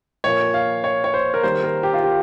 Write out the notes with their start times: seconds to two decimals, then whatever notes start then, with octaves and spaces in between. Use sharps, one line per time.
0.24 A#2 F3 A#3 C#5
0.54 F5
0.84 C#5
1.04 C#5
1.14 C5
1.34 A#4
1.43 D#3 G3 A#3 C5
1.64 A#4
1.83 G4
1.93 F4
2.04 G4